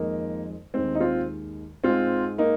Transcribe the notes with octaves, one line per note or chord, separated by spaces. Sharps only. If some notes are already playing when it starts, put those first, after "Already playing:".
Already playing: F2 D#3 G#3 A#3 D#4
D#2 D#3 G#3 C4
D#4
C4 F4
G#2 G#3 C4 F4
A#3 D#4